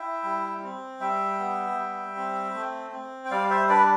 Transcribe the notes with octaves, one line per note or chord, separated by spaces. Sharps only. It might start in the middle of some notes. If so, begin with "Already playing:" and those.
Already playing: E4 E5 G5
G3
C4
G3 E5 G5
B3
G3
C4
A3
C4
G5
G3 D5 F5
C5 E5
D4 B4 D5